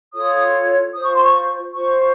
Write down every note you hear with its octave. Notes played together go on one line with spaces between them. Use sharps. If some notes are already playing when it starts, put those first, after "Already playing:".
F4 A4 C#5 D#6
F4 C5 D#6
C#6
C6
C#6
F4 C5 C#6